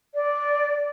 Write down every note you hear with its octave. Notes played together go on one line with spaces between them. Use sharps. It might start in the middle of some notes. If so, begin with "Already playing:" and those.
D5